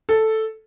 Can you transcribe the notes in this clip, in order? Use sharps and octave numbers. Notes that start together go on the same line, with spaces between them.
A4